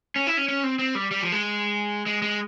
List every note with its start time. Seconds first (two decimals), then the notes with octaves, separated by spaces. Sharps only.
0.16 C#4
0.27 E4
0.37 C#4
0.48 C#4
0.64 C4
0.79 C4
0.95 G3
1.11 G3
1.22 F3
1.32 G#3
2.06 G#3
2.22 G#3